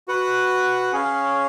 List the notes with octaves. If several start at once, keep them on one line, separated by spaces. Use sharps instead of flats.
F#4 B4 F#5
C#4 G#4 C#5 F5